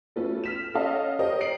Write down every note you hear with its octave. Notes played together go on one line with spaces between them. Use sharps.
A3 B3 C#4 F4 F#4 A4
F6 B6 E7
C#4 A4 C#5 D#5 F5 F#5
G4 A#4 C5 C#5 D#5
C7 D7 F#7